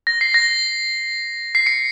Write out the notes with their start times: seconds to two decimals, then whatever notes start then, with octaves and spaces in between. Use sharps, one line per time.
0.07 A#6
0.21 C7
0.34 A#6
1.55 C7
1.66 C#7